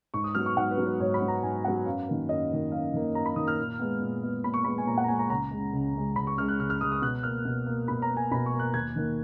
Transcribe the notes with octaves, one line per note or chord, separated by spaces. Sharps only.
G#2 C#6
D#6
F#3 B3 F6
C#6
G#2 F#5
B4
F#3 B3
B4
G#2 C#5
B5
F#3 B3
A#5
G#2 G#5
F#3 B3 F#5
F#2 F5
D#3 A#3
F#2 D#5
D#3 A#3
F#2 F5
D#3 A#3
F#2 A#5
B5
D#3 A#3 D#6
F6
A#2
G#3 B3
A#2
G#3 B3
A#2 B5
C#6
G#3 B3 B5
G#5
A#2 A#5
F#5
A#5
G#3 B3 G#5
A#5
C#2 A#5
C#3 G#3
C#2
C#3 G#3
C#2 B5
C#6
C#3 G#3 F6
F#6
C#2 F6
F6
C#3 G#3 D#6
D#6
B2 F#6
A#3 F6
B2
A#3
B2 B5
A#5
A#3
G#5
B2 B5
C#6
A#3
F#6
D#2 G#6
D#3 A#3